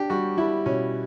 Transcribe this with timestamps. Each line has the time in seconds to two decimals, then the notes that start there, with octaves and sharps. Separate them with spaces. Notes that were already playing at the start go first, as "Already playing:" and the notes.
Already playing: D4 G4
0.10 G3 F#4
0.37 G3 E4
0.66 B2 C#4